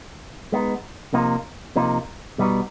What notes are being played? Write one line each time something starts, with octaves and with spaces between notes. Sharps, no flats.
G#3 B3 D#4
C3 F3 A#3 D#4
C3 F3 A#3 D#4
B2 G3 B3 D#4